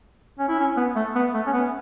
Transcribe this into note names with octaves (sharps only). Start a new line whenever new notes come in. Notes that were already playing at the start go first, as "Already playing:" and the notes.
C#4
E4
C#4
B3
A3
B3
A3
C#4
B3